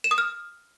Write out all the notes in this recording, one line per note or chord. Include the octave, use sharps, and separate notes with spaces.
E7
D#6
F6